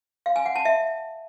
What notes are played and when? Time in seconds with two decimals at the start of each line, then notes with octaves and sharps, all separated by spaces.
0.26 F5
0.36 G#5
0.46 F#5
0.56 A5
0.65 E5